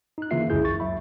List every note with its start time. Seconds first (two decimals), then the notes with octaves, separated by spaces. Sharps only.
0.18 D#4 F#6
0.31 C#3 E3 A#3 F4 E5 C7
0.50 G1 C#2 F#2 E4 G#4 G6
0.65 C#6 A6
0.80 F#3 E5 B5